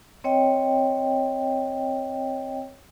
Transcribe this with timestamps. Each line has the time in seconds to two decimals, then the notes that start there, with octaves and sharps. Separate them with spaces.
0.24 C4 C#5 D#5 G5